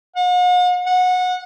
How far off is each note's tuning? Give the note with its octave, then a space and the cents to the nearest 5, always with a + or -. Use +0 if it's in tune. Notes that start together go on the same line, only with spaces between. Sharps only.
F#5 -45
F#5 -20